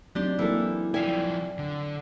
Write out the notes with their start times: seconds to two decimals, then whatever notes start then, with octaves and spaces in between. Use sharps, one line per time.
0.15 F#3 C4 D4 D#4 G4 C6
0.39 E3 A#3 E4 A4
0.94 F3 E4 D5 F5 G5 G#5
1.58 D3